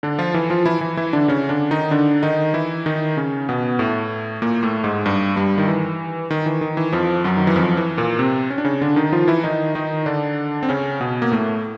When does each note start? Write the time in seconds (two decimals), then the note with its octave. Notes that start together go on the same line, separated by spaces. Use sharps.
0.03 D3 D4
0.19 F3 F4
0.34 E3 E4
0.50 F3 F4
0.66 E3 E4
0.81 E3 E4
0.97 E3 E4
1.13 D3 D4
1.28 C#3 C#4
1.49 D3 D4
1.71 D#3 D#4
1.91 D3 D4
2.23 D#3 D#4
2.54 E3 E4
2.86 D#3 D#4
3.17 C#3 C#4
3.49 B2 B3
3.79 A2 A3
4.42 A#2 A#3
4.63 A2 A3
4.84 G#2 G#3
5.06 G2 G3
5.36 G2 G3
5.58 D#3
5.68 E3
6.31 D#3
6.46 E3
6.61 D#3
6.77 E3
6.92 F2 F3
7.24 F#2 F#3
7.37 D#3
7.47 E3
7.56 F2 F3
7.77 E3
7.98 A#2 A#3
8.19 C3 C4
8.50 C#4
8.58 D4
8.65 C#3 C#4
8.81 D3 D4
8.96 D#3 D#4
9.12 F3 F4
9.28 E3 E4
9.44 D#3 D#4
9.75 D#3 D#4
10.06 D3 D4
10.63 C4
10.69 C#3 C#4
11.00 B2 B3
11.22 A#3
11.31 A2 A3